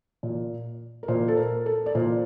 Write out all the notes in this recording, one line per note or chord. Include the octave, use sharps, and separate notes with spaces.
A#2
A#4
A#2 C5
A4
A#4
A4
D5
A#2 C5